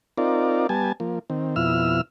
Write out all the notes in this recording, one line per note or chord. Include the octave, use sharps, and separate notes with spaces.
C4 D#4 F4 A#4 D5
G3 B3 G#5 A5
F3 A#3
D#3 C4
F2 B2 E4 E6 F6